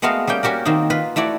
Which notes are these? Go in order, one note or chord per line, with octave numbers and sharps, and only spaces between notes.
G#3 A3 B3 F#4 A#4 F5
G3 A#3 C#4 G5
C#4 F#4 G4 A#4
D#3 A#3 C4 D#4
F4 B4
A3 E4 F#4 D5